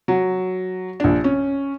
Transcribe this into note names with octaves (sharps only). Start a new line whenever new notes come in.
F#3
A#1 D4
C#4